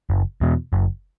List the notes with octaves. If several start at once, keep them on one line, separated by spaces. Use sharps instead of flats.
F#1
E2 B2
F#1